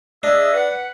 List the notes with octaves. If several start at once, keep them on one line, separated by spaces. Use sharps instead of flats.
D4 G#4 D#5 E5
B4 F#5